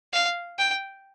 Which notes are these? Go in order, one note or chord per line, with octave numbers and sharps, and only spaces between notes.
F5
G5